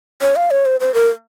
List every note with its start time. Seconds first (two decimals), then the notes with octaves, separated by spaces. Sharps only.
0.21 C#5
0.36 F5
0.51 C#5
0.66 C5
0.80 C5
0.94 A#4